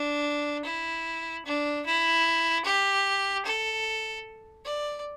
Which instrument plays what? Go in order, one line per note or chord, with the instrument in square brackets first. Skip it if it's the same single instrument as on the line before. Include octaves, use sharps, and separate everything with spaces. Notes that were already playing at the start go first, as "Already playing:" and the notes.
Already playing: [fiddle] D4
E4
D4
E4
G4
A4
D5